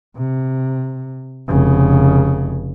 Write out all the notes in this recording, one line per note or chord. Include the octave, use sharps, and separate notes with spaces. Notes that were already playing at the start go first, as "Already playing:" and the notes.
C3
F1 C#3